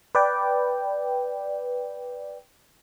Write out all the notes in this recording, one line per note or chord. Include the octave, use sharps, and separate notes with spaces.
B4 D5 G5